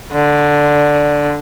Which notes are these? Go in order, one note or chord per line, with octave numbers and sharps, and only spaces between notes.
D3